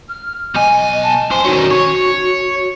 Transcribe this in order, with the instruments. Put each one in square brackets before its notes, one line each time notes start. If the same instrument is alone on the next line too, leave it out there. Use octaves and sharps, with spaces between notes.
[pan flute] F6
[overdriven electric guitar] B1 G#5 [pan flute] D#5
[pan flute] A5
[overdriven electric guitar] F2 C5 [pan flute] G#5
[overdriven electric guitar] D#3 C#4 [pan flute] F#4
[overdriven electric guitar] C#5